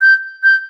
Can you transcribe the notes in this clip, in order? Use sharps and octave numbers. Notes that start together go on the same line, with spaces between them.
G6
G6